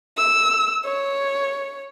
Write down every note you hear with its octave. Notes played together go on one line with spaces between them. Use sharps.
E6
C#5